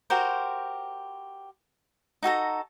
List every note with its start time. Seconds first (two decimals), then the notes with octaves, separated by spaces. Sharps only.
0.10 F#4 G4 A#4 C5
2.23 D#4 F#4 A4 A#5